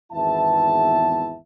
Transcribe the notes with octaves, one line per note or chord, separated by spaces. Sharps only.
G#1 E2 B3 E4 E5 A5